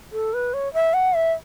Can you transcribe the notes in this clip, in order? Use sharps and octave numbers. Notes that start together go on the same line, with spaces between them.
A4
B4
C#5
E5
F#5
E5